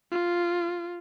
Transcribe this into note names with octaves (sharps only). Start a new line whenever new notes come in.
F4